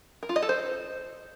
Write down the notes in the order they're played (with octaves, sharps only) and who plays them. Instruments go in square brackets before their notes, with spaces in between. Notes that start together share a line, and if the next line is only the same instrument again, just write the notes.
[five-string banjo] A#4
F4
D#5
A4
C5